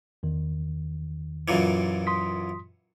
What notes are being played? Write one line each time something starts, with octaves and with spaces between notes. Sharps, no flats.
E2 D#3
F#2 A#2 E3
C6 D#6 B6